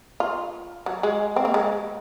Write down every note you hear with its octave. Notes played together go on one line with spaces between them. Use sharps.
F4
F#3
G#3
C4
A#3
G#3